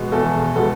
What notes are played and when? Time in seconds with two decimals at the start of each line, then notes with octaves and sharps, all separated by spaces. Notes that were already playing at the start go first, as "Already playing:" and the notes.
Already playing: B2 G#3 B3
0.12 E2 A4
0.56 B2 G#3 B3 A4